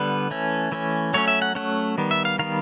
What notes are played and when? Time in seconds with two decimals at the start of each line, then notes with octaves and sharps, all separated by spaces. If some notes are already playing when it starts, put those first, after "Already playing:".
Already playing: D3 G3 B3 B4
0.31 E3 A3 C#4
0.72 E3 A3 C#4
1.13 F#3 A3 C#4 C#5
1.28 E5
1.42 F#5
1.55 F#3 A3 C#4 F#5
1.98 D#3 G3 B3
2.11 E5
2.25 F5
2.39 D#3 G3 B3 F5